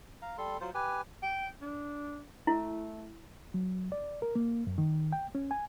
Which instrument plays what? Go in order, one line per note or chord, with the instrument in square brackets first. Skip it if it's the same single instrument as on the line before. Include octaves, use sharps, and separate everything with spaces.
[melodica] F5 A#5
G3 A4 C6
F#3 F4 C5
G4 B4 G#5
[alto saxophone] G5
D4
[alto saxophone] A3 [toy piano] E4
[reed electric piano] F#3
D5
A#4
A#3
F#2
D#3
G5
C#4
G#5